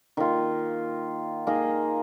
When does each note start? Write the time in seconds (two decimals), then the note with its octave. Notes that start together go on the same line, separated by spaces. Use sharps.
0.17 D#3 A#3 F4
1.47 A#3 D#4 G#4